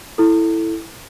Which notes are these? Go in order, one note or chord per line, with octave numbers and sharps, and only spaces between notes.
E4 A4